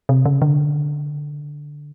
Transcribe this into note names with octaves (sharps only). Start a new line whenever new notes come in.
C3
C#3
D3